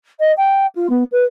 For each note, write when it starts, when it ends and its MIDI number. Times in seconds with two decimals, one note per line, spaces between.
0.19 0.31 75
0.37 0.66 79
0.75 0.89 65
0.89 1.03 59
1.11 1.24 71